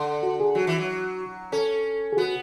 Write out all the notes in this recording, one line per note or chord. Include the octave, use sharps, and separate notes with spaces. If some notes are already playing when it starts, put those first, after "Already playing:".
Already playing: D3
F#4
G#4
F#3 F#4
E3
F#3
C#4 A4
G#4
B3 F#4